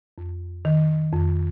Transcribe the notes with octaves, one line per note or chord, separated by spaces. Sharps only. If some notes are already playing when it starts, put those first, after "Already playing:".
F2
D#3
F2